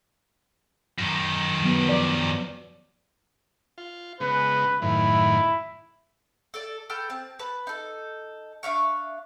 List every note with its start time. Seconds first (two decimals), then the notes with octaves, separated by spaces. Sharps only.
0.99 F#2 D#3
1.62 F#3 B3
1.87 F3 D5
3.78 F4
4.20 C#3 G#3 B3 B4
4.82 F#2 A2 D#3 E4
6.54 A4 D5
6.90 A4 B4 G5 F6
7.10 C4 A5
7.39 B4 A5
7.67 D#4 A4
8.63 D4 E5 F5 C#6